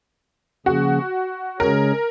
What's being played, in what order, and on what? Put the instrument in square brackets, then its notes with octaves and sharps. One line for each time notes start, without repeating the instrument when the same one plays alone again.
[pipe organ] C#3 F3 A#3 C#4 G#4 [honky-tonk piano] F#4
[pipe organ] C#3 G#3 C#4 G#4 C#5 [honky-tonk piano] A#4